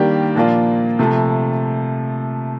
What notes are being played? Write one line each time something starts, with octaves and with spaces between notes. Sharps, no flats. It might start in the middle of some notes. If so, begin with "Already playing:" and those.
Already playing: D#3 G3 A#3 D4 G4
A#2 F3 A#3 D4 F4
C3 F3 A3